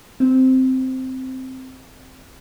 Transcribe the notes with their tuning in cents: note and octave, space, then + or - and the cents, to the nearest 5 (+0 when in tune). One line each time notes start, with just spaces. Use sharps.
C4 -5